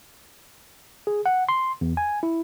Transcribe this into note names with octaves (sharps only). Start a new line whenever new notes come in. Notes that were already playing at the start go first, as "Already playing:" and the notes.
G#4
F#5
C6
E2
G#5
E4